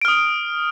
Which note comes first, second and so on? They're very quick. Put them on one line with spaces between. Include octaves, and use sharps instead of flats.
D7 F6 D#6